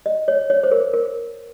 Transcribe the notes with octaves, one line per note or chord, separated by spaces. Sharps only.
D#5
C#5
C#5
C5
A#4
A#4